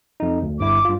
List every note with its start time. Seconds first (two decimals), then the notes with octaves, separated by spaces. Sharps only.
0.20 F2 D#4
0.42 D2
0.59 G1 G2 E4 D6
0.85 G2 F4